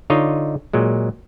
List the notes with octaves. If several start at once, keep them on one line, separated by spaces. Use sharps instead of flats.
D3 D#4 F4 C#5 D#5
A#2 F#3 G#3